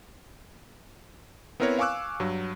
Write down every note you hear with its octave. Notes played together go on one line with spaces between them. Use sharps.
B3 C4 E4 A#4 B4 C#5
F5 G#5 C#6 D6 E6 F#6
G2 F#3